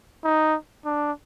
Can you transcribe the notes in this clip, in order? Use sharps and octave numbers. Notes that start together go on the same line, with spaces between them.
D#4
D4